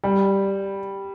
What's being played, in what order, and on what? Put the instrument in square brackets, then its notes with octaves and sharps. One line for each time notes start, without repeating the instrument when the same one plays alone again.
[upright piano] G3